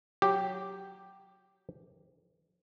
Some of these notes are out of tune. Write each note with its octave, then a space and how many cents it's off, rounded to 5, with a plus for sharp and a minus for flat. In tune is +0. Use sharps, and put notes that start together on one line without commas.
F#3 +0 G4 +0